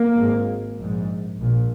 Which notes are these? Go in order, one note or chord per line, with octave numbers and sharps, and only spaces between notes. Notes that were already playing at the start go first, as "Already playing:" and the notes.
Already playing: A#3
G#1 G#2
A#1 G#2
A#1 A#2